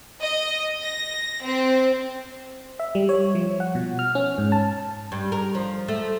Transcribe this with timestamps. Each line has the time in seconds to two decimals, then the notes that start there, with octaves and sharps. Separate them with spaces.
0.21 D#5
0.82 A#6
1.44 C4
2.80 E5
2.95 G3
3.09 C#5
3.35 F3
3.60 F#5
3.75 B2
3.99 F6
4.15 C#4
4.38 G#2
4.52 A5
5.12 G2
5.32 A#4
5.55 F3
5.88 A3